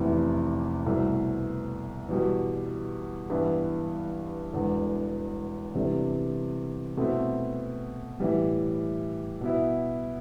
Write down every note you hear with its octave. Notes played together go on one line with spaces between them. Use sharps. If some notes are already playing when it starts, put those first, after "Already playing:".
Already playing: F1 E2 C3 E3
C2 B2 A3
E2 B2 G3
G2 E3 B3
E1 E2 D3
E2 C3 G3 D4 A4
B2 A3 C4 E4
A2 E3 G3
B2 B3 E4